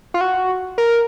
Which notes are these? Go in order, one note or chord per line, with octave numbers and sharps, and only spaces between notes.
F4
F#4
A#4